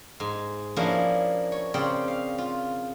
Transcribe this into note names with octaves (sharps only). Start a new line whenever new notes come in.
G#2
F3 A#3 C#4 D4 E4 G#4
C#5
C#3 C4 D5 G5
F5
F4